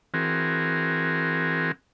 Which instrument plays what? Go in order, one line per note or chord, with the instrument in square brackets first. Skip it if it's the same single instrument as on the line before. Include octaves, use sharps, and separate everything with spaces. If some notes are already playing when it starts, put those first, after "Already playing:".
[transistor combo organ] E3 C4 F#4 G#4 A#4